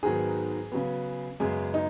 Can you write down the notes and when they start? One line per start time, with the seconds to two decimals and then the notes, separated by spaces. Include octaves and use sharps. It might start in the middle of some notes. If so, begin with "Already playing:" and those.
0.03 G#2 D#3 F#3 B3 G#4
0.72 C#3 F#3 B3
1.40 F#2 C#3 G#3 B3 G#4
1.74 D#4